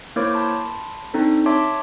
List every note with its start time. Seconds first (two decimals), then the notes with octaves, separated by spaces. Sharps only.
0.16 A#3 E4 A#4 C5 C#5 D6
0.33 A5 B5 C6
1.14 C4 D4 D#4 A4 C5
1.46 C#5 E5 A5 C6 D6